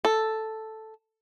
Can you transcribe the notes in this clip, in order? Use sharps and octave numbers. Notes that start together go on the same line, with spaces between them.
A4